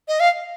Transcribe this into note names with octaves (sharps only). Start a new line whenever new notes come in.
D#5
F5